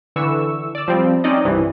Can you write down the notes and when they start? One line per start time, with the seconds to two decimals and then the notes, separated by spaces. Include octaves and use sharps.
0.16 D3 E3 C#6 E6
0.75 D5 E6
0.88 F3 G3 C4
1.24 C4 C#4 D#4 D5 D#5
1.45 C2 G2 E3